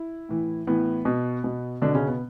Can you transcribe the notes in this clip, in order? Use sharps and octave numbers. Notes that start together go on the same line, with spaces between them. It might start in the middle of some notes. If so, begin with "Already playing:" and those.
Already playing: E4
A2 E3
A2 E3 B3
B2
B2
B2 D3 D4
C#3 C#4
B3